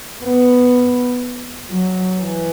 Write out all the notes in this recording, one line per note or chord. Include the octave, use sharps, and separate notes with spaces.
B3
F#3
E3